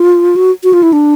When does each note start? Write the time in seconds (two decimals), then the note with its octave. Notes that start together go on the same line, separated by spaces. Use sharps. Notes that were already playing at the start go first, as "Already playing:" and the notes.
Already playing: F4
0.36 F#4
0.64 F#4
0.73 F4
0.83 E4
0.93 D4